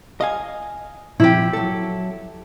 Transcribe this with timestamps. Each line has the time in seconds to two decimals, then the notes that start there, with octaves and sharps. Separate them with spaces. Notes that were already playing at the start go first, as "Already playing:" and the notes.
0.21 D#5 F5 G#5
1.20 A#2 F3 C4 E4 G4
1.53 F#3 A4